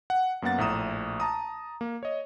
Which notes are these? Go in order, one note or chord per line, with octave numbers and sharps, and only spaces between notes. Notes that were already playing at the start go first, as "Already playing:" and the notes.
F#5
F#2 A#3 B3 F#5 A6
A#1 A2 A#5 D#6 E7
A5 A#5 D#6
A#3
C#5 D#5